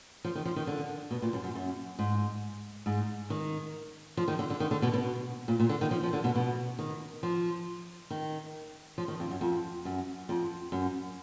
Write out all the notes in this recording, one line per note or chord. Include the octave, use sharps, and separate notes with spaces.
F3
D#3
F3
D#3
D3
B2
A#2
F#2
F#2
F#2
G#2
G#2
D#3
F3
D#3
D3
D3
D#3
D3
B2
B2
A#2
A#2
D3
D#3
F3
F3
D3
B2
B2
D#3
F3
D#3
F3
D#3
F2
F#2
F2
F#2
F2
F#2